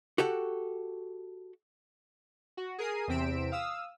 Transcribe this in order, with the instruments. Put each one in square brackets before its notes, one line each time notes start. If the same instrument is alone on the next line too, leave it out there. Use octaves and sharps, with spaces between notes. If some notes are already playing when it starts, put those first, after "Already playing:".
[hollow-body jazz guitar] F#4 G4 A4 F#5
[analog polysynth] F#4
G#4 A#4 C7 D#7
E2 C3 C4 B6 D7 E7
F5 D#6 E6